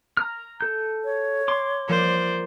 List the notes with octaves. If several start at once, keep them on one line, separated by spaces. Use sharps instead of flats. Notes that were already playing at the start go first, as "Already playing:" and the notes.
A#5 F6
A4 G6
C#5
C6 D6
F3 A#3 A#4 C5 D5